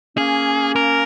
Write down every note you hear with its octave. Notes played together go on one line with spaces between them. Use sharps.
A#3 C#4 G#4
A#4